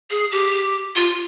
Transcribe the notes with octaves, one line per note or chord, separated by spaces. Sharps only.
G#4
G4
F4